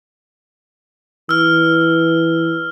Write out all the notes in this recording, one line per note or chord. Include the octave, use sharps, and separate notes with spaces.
E3 E6 F6